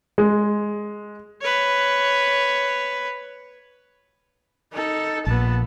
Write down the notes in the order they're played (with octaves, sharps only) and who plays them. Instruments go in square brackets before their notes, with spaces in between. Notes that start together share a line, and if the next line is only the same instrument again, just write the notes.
[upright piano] G#3
[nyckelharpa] B4 C#5
[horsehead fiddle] D#4 A4
[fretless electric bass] A#1 A#2 [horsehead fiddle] B3 A5